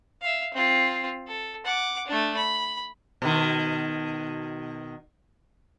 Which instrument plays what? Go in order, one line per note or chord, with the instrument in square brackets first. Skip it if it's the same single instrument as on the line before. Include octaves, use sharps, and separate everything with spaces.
[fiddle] E5 F5
C4 F4
A4
F#5 D6
A3 D4
B5
[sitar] B2 D#3